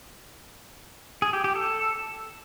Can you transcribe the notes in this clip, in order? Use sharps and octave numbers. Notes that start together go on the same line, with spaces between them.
G#4
G4
G4
A4